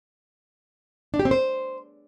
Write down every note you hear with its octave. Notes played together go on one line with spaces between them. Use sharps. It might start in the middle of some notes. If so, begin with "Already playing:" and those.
D4
G4
C4
C5